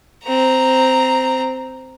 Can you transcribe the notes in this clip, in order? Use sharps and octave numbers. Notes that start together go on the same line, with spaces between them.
C4 A#5